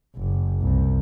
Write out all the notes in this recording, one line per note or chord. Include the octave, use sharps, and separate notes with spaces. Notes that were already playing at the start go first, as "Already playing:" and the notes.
F#1
C2